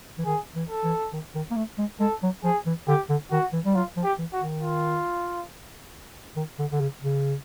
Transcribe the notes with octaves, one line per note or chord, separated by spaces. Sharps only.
E3
D#3 G#4
E3
A4
E3
D#3
D#3
A#3
A3
G#3
G#3 A4
F#3
F3 G#4
E3
D3 G4
D3
D#3 F#4
E3
G3
F#3 F4
F3
G4
E3
F#4
D#3
F4
D#3
D3
D3
C#3
C#3